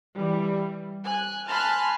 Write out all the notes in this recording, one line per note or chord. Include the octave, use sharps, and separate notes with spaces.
E3 G3
G#5 F#6
G#5 A5 B5 C6 F6 F#6